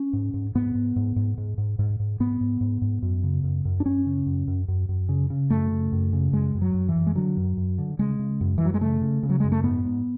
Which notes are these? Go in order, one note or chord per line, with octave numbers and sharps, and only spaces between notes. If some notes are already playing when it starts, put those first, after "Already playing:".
Already playing: C#4
G#2
G#2
G#2 B3
G#2
G#2
G#2
G#2
G#2
G#2
G#2
G#2 B3
G#2
G#2
G#2
F#2
C#3
F#2
F#2
D4
F#2 C#4
C#3
F#2
F#2
F#2
F#2
C#3
C#3
F#2 A3
C#3
F#2
C#3
F#2 G#3
F#2
F#3
F#2
E3
F#2
G#3
D3 F#3
F#2
F#2
D3
C#3 G#3
C#3
F#2
F#2 E3
F#3
G#3
C#3 A3
C#3
C#3
F#3
F#2 G#3
A3
G#2 B3
G#2